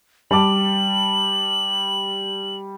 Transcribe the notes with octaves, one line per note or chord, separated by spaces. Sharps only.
G3 A5 D6 F#7